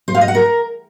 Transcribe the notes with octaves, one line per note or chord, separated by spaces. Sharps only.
C5
F5
D#5
F#5
A#4